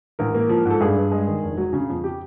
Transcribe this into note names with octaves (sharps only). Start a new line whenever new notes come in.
A1 A#4
A#3
F3
G#2
A4
G2 G#4
G2
G#3
D#3
F1
F#3
C#3
F2
G4